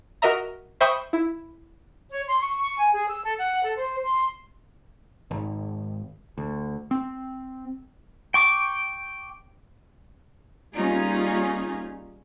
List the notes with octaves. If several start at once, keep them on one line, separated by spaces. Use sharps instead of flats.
F#4 A#4 D#5 E5 A#5
C5 E5 G5 B5 C#6 D#6
E4
C#5
C6
C#6
C#6
G#5
G#4
E6
A4
F#5
A4
C5
C6
G#1
D2
C4
G5 C#6 D6
G3 A#3 C#4 D#4 F4 G#4